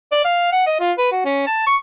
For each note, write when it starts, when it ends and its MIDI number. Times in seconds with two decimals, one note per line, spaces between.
0.12 0.25 74
0.25 0.51 77
0.52 0.65 78
0.67 0.77 75
0.80 0.92 65
0.98 1.11 71
1.12 1.24 66
1.25 1.44 61
1.47 1.66 81
1.67 1.76 85